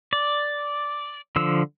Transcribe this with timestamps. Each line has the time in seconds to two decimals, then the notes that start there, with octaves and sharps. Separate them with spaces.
0.13 D5
1.36 D3 F3 E6